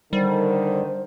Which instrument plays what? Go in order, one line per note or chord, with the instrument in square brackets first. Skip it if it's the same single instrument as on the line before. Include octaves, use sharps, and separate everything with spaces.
[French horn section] D3 D#3 [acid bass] G3 [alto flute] C5